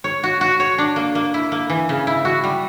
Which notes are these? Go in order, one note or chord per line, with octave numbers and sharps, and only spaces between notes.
C#5
F#4
F#4
C#5
D4
A#3
A#3
E4
A#3
E3
C#3
E4
F#4
G3